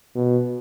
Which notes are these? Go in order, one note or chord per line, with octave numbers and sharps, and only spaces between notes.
B2